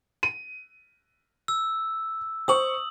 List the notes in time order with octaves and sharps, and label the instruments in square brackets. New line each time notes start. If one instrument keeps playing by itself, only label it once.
[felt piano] D#7
[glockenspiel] E6
[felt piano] C5 C#6 [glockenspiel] D#6 F#7